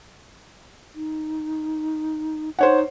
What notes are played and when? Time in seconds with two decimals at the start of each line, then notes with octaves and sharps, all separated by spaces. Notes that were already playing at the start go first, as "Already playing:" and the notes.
0.95 D#4
2.59 D#4 C5 C#5 F#5